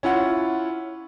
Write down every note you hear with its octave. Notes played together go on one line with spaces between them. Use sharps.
C#4 E4 F4 F#5